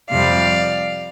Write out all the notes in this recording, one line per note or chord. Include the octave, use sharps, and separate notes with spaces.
F2 C3 G3 D5 F5